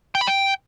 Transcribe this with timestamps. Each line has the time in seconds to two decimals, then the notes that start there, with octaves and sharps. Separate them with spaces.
0.15 G5
0.21 B5
0.27 G5